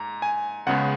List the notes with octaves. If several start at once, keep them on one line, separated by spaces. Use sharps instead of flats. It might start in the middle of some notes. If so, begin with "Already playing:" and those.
Already playing: G#2 A#5
G#5
C#2 C#3 G#3 B3 F#5